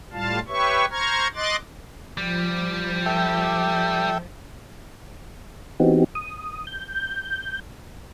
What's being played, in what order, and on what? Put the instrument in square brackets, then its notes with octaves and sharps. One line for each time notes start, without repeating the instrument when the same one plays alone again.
[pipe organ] A2 G3 F4 F5 A5
G4 B4 C#5 E5 C#6
C5 A#5 C#6 F6 G#6
D#5 C6 D6 F#6 A6
[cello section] F3 [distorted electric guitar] G3
[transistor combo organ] A4 E5 G5
[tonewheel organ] E3 B3 C4 D#4 F#4 G4
D#6
G6